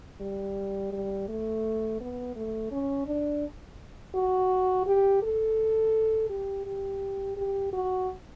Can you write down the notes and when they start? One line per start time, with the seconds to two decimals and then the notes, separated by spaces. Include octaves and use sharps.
0.21 G3
0.92 G3
1.28 A3
2.00 B3
2.36 A3
2.72 C#4
3.07 D4
4.15 F#4
4.87 G4
5.22 A4
6.30 G4
6.66 G4
7.37 G4
7.73 F#4